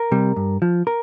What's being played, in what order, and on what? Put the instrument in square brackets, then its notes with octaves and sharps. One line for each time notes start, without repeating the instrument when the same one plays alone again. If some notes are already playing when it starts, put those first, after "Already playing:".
Already playing: [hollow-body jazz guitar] A#4
C3 G3
G2
F3
A#4